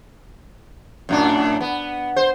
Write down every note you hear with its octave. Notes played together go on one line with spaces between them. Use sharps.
F#2 A2 D4
B3
C5